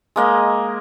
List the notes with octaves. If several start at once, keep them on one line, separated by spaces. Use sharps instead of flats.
G#3 A#3 D#5